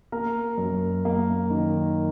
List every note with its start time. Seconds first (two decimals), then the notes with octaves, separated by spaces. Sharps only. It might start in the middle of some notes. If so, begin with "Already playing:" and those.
0.12 A#3 A#4
0.58 F#2
1.05 A#3
1.50 D#3